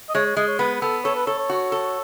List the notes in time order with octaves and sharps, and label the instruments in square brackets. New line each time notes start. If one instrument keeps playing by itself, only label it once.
[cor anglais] D#5
[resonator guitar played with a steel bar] G#3 [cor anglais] C#5
[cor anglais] C#5
[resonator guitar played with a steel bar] G#3 [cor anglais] D#5
[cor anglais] C#5
[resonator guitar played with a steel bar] B3 [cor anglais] B4
[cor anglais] B4
[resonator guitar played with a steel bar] B3 [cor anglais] A4
[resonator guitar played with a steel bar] A4 [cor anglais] C#5
[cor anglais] B4
[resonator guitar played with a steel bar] A4 [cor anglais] C#5
[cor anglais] C#5
[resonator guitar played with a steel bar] F#4
A4